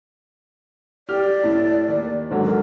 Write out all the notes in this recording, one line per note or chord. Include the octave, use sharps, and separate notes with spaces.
G4 D5 F6
A2
D#2
G#2 D3 F#3
A#4